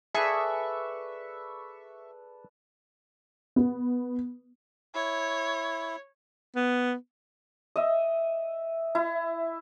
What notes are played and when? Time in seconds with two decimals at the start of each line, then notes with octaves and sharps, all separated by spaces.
0.14 G#4 A4 B4 D5 E5 C#6
3.56 B3
4.95 E4 C#5
6.56 B3
7.76 D#5 E5
8.95 E4